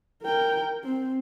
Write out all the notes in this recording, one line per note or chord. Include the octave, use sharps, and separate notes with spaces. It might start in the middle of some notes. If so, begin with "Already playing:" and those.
A#4 G5
C4